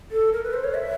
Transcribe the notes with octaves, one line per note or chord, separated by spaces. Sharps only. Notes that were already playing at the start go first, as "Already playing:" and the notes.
A4
A#4
B4
C5
C#5
E5